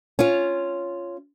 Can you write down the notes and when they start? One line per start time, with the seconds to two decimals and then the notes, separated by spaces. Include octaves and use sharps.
0.19 C#4 F4